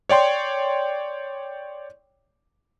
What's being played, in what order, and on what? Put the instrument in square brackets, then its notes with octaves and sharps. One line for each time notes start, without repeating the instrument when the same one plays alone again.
[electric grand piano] C#5 D5 G5 C6